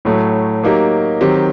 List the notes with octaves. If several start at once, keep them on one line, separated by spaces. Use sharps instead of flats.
A2 F#3 A3
F#3 A#3 D#4 G4
D#3 F#3 C4 G4